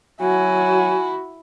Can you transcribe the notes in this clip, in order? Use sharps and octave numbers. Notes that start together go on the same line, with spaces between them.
F#3 E4 F#4 G#5